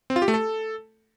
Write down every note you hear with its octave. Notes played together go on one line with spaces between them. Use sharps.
C4
F4
G4
A3
A4